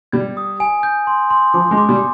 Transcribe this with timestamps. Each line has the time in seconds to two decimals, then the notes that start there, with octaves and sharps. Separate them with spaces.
0.13 G3 G#6
0.37 D#6
0.60 G#5
0.83 G6
1.07 C6
1.30 C6
1.54 F3 D6
1.71 G#3
1.78 D6
1.89 G3